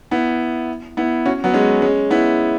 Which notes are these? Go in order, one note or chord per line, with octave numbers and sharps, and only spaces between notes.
B3 E4
B3 E4
C#4 F#4
F#3 B3
G#3 C#4
G#3 C#4
B3 E4